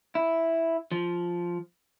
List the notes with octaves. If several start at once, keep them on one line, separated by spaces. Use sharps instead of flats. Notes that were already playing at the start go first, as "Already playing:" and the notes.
E4
F3